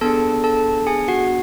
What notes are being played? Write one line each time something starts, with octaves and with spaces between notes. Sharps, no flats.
B3 D4 G#4 A4 A5
A4 A5
G#4 G#5
F#4 F#5